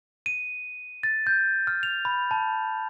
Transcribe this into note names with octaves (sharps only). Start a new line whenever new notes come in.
D#7
A6
G6
F6
F7
B5
A5